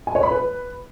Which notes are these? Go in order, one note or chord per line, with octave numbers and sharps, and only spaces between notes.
G#5
C#5
B5
B4